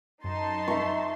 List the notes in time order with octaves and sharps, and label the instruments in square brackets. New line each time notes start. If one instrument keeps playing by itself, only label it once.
[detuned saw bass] F#2 [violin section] D#4 A5 C6
[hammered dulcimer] E5 A#5 C#6